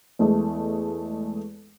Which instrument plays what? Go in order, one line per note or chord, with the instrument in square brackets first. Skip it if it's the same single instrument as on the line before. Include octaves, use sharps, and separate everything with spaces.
[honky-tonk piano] E2 G#3 A3